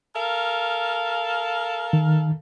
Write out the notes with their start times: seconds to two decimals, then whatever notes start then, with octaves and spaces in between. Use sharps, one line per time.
0.16 A4 A#4 F5
1.93 D#3